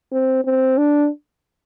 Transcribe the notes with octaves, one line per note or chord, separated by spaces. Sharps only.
C4
C4
D4